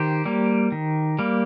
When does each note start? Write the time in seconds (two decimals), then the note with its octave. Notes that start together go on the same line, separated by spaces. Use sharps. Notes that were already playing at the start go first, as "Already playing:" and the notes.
Already playing: D#3 G4 C5
0.25 G3 A#3
0.72 D#3
1.19 G3 A#3